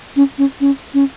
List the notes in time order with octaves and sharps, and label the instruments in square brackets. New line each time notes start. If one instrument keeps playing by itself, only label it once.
[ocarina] C#4
C#4
C#4
C#4